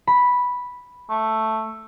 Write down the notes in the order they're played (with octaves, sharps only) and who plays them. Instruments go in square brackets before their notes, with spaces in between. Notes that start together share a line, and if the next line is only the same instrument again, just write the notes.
[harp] B5
[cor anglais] A3